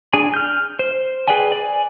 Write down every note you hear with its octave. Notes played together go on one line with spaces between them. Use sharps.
D4 G#4 G#5
F6 G6
C5
G#4 B4 D5 G5 G#5
D5 G#5